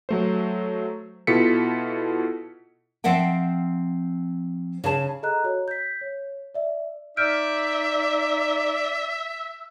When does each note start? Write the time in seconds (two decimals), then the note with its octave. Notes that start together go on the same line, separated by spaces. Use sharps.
0.09 F#3 A3 C5
1.27 B2 E4 F4 A4 B6 C#7
3.04 F3 C4 E5 F#5 G5
4.84 C#3 G#4 A5
5.23 G#4 A4 D#5 A#5 F#6
5.44 F#4 C#5
5.68 G6 B6
6.01 C#5
6.54 D5 E5
7.17 D#4 D5 E5 F6 G6 D7